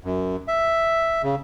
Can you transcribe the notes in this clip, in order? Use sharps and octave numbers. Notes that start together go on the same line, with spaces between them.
F#2
E5
C#3